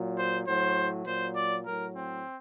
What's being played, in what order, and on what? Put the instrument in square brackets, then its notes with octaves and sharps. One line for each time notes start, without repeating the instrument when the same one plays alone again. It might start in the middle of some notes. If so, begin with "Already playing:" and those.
Already playing: [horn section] A#2 F#3
C5
A2 F#3 C5
A#2 F#3 C5
D5
A2 F#3 A#4
C4